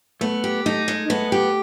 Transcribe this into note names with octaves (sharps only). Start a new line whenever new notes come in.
A3 B3
G4
A3 D#4
G#3
A3 B3
G4